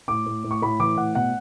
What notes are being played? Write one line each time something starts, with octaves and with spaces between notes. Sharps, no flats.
A2 D6
A2
A2
C#6
A2 B5
E3 D6
A2 F#5
B2 F#5